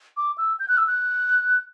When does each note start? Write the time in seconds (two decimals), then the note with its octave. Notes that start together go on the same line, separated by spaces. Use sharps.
0.17 D6
0.38 E6
0.60 G6
0.68 F#6
0.77 E6
0.87 F#6